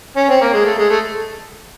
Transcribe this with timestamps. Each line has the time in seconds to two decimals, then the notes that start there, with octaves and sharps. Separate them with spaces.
0.17 C#4
0.29 C4
0.42 A#3
0.53 G#3
0.65 A3
0.78 G#3
0.90 A3